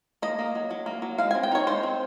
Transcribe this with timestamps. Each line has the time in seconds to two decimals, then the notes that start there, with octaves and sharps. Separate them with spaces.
0.22 A#3 D#5
0.39 A#3
0.55 F#3
0.71 F#3
0.86 A#3
1.02 F#3
1.18 G#3 F5
1.31 G#5
1.34 C4
1.43 G5
1.51 D#4 C#5
1.67 G#3 C5
1.83 C4